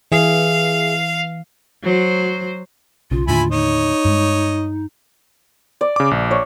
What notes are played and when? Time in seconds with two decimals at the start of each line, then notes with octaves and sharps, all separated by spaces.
0.12 E3 G#4 E5 F5
1.83 F#3 C5
3.11 B1 C#3 F4
3.27 D#2 A2 D3 E4 F4 G#5 B5
3.52 D#4 C#5 D#5
4.05 G2 G#3
5.81 D5
5.96 C#3 D6
6.11 A#1
6.31 C#5